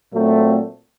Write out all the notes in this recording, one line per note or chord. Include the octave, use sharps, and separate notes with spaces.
A#2 F#3 A3 C4